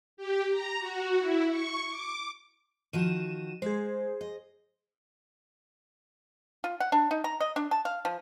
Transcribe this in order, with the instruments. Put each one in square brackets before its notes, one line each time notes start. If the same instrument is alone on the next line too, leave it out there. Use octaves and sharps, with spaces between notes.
[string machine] G4
A#5
F#4
E4
C#6
D6
[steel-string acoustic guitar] D#3 F3 F#4 [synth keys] D#7 E7
[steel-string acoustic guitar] G#3 [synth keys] G#4 C5
[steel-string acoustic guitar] D#5
[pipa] F4
F#5
D4
D#4
A#5
D#5
D4
A5
F5
F3